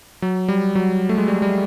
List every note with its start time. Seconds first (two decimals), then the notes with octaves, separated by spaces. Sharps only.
0.22 F#3
0.48 G3
0.75 F#3
1.09 A3
1.18 G#3
1.28 G3
1.42 G3